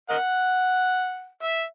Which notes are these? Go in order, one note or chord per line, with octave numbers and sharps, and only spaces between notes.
A#4 D#5 F#5
E5